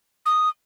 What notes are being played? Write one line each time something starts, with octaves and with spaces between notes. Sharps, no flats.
D#6